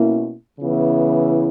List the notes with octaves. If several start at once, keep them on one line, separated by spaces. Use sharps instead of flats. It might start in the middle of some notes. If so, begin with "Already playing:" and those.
Already playing: B2 A#3 C#4 E4
C#3 E3 B3 E4